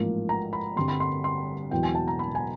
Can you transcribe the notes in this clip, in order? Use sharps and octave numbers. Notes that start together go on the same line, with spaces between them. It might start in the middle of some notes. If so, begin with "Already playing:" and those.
Already playing: A1 G#2 F3 A#3
A#5
B5
G2 D3 G3 C4 C6
B5
C6
C6
E1 E2 B2 F#3 B3 G5
G#5
A5
A#5
B5
G#5